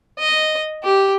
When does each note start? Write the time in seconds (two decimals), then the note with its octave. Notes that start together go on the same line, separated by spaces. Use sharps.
0.19 D#5
0.84 G4